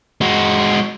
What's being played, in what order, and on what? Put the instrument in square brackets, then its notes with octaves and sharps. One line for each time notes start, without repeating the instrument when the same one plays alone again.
[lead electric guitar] G#3 F#4